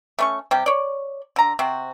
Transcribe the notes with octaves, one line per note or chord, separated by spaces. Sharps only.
A3 C#4 C#6
C3 G3 G4
C#5 D5
D3 A#5
C3 C4 F#4